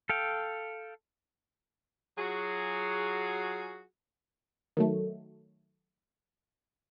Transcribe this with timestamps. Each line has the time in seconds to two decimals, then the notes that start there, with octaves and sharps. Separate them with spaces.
0.09 A4 F5 G5
2.18 F#3 F4 F#4 G#4
4.77 D#3 F#3 A3